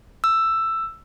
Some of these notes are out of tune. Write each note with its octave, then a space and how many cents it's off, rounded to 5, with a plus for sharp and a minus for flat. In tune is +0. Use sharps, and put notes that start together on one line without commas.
E6 +10